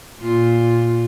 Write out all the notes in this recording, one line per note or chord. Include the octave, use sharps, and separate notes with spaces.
A#2 F4